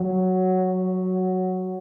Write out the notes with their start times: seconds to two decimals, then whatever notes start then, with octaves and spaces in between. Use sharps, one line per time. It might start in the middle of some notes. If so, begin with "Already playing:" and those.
Already playing: F#3